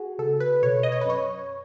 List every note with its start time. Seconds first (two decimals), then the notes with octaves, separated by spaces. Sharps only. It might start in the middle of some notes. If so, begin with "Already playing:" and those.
Already playing: F#4 G#4
0.19 C#2 A4
0.40 B4
0.63 B2 C#5
0.83 D#5
0.92 C#5
1.01 B4
1.05 F#2 C#5